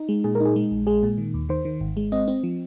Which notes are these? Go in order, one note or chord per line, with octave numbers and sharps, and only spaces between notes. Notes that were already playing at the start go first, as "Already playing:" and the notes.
Already playing: D#4
G#3
A#2 G#4
A#4
D#4
G#4
G#3
A#1
G#3 G#4
A#2
D#3
D#2
D#3 C5
D#3
G#1
G#3
C4 D#5
C4
F3